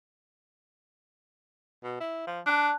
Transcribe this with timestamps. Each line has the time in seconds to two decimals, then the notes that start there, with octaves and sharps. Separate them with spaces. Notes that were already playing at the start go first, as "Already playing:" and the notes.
1.83 B2
2.00 E4
2.27 F3
2.46 D4 A5 F#6